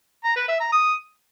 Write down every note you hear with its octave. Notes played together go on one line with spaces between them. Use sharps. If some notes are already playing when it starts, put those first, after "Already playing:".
A#5
B4
E5
A#5
D#6